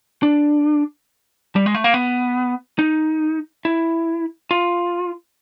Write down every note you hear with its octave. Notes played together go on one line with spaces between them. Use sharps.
D4
G3
G#3
A3
A#3
B3
D#4
E4
F4